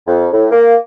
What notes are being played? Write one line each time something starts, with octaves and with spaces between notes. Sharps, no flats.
F2
A2
A#3